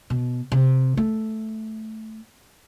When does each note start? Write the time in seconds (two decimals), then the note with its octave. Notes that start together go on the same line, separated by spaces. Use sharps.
0.10 B2
0.52 C3
0.97 A3